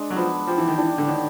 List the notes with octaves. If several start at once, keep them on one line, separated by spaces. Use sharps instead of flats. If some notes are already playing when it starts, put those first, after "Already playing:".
Already playing: G#3 D4
F#3
F3 B3
F3 G4
E3
D#3
E3 D4
D3
A2 D#3